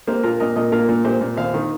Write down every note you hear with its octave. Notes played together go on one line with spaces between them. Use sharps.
A#3 G4 C5
A#2 F4 A#4
A#2 A#4 D#5
A#2 A#4 D#5
A#3 F4 A#4
A#2
A#2 G4 C5
A#2
D#2 C5 F5
D#3